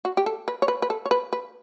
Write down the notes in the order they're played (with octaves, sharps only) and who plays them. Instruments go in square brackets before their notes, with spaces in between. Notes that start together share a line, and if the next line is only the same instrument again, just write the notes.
[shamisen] F#4
G4
A4
B4
C#5
B4
B4
A4
C#5
B4
B4